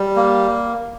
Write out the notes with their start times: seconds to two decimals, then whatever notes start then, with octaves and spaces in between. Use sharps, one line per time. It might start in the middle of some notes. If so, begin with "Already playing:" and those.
Already playing: G3
0.16 A#3